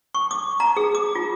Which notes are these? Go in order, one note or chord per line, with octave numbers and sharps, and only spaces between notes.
C#6
D6
A#5
G#4
D6
F4